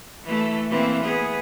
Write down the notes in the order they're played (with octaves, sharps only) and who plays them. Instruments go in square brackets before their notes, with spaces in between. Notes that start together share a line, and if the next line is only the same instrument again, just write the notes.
[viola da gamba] E3 A3
E3 A#3 C4
B3 G#4